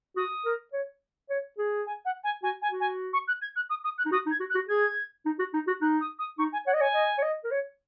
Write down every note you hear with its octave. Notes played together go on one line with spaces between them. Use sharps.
F#4 D#6
A#4
C#5
C#5
G#4
G#5
F#5
G#5
F#4 G#5
G#5
F#4
G#5
C#6
F#6
G#6
F#6
D#6
D#6
F#6
D#4
F#4 D#6
D#4
G#6
F#4
F#6
F#4
G#4 G#6
D#4
F#4
D#4
F#4
D#4 F#6
D#6
D#6
D#4 C#6
G#5
C#5 F#5
D#5
C#5 G#5
D#5
C#5
D#5
A#4
C#5